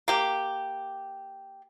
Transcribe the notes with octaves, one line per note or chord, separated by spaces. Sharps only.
A#3 G4